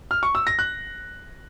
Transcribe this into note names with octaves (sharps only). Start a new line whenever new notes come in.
F6
C#6
E6
A#6
F#6